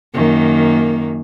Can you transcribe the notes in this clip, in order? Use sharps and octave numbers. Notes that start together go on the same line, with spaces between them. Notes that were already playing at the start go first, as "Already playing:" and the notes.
F#2 D#3 A#3